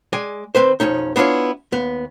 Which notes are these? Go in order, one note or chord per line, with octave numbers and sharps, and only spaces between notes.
G#3 D5 G#5
D#3 F3 C4 B4 C5
B1 F2 C#4 D#4
B3 D4 E4 F4 C#5
D#2 B3